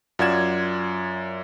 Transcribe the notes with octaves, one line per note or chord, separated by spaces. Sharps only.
F#2 F4 D5 F#5 G#6 E7